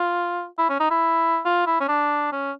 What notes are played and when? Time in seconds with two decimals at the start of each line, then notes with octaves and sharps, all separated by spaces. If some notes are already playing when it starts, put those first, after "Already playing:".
Already playing: F4
0.59 E4
0.70 C#4
0.80 D#4
0.91 E4
1.45 F4
1.67 E4
1.81 C#4
1.88 D4
2.32 C#4